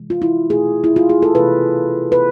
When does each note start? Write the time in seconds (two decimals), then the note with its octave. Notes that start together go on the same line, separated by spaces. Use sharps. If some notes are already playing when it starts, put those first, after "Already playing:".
Already playing: C3 E3 G#3
0.10 F4
0.22 E4
0.50 B2 A3 G#4
0.84 E4
0.96 F4
1.09 G#4
1.22 A4
1.35 C3 E3 A3 B4
2.12 B4